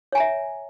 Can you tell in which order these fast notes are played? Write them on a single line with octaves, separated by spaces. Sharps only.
C#5 G#5 A#5 E5